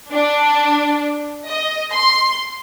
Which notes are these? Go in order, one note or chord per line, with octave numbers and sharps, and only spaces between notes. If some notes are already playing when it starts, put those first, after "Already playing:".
D4
D#5
C6